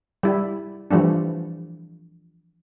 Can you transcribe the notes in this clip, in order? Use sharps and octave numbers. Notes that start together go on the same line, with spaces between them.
G3 E4
E3 F3 G3 A3 D4